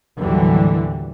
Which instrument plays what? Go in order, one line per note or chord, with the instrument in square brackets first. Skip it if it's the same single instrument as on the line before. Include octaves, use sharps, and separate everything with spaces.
[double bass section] D#2 A2 D3 E3 F#3 G3